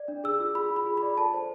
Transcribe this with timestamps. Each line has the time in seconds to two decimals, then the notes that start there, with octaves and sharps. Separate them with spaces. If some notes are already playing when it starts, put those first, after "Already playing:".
Already playing: D5
0.08 D4
0.24 G#4 E6
0.39 F4
0.55 G#4 B5
0.70 F4
0.76 B5
0.86 G#4
0.97 B5
1.03 D5
1.18 A4 A5
1.34 C5